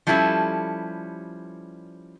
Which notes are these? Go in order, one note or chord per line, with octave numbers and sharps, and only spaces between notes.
F3 G3 C#4 E4 G4 A4